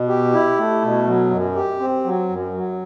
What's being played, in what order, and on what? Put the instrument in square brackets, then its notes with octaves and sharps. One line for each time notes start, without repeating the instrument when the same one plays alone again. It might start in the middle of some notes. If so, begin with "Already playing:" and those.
Already playing: [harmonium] B2
G4
E4
A3
B2
F#3
F#2
G4
C4
F#3
F#2
F#3